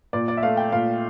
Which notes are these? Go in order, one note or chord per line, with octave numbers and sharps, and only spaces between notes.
A#2 D5
D5
E5
A3 F5
G5
A#2 F5